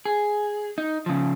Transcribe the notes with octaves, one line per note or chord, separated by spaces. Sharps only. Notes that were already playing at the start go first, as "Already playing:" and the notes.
G#4
D#4
C#3 F3